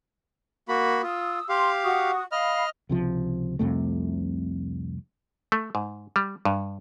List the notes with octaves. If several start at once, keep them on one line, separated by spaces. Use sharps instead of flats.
A#3 F#4 B5
F4 D#6 E6
G4 F5 C6
F#4 C#6 D#6
D#5 F5 B5 F6
C#2 C3 F3
C2 F2 C3 A3
A3
G#2
G3
G2